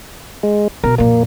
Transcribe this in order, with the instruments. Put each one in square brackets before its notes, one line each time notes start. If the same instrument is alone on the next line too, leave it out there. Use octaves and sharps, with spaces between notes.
[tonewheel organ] G#3
[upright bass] B2 [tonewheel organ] A#4
[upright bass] F2 A#2 [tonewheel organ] A#3